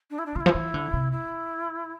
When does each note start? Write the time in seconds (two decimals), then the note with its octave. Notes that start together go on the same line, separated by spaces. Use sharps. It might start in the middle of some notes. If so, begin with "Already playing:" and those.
0.10 D4
0.18 E4
0.26 D4
0.35 D3 E4 F4
0.46 F3
0.55 E3
0.74 D3
0.93 C3
1.12 E4